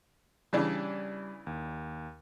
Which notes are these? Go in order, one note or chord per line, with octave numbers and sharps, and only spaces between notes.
C#3 E3 G3 D4
D#2